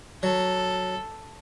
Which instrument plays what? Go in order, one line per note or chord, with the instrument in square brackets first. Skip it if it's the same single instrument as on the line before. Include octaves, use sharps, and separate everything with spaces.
[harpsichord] F#3 [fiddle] A4